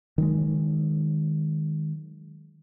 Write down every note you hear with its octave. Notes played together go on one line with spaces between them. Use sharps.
D#3 F#3 G#3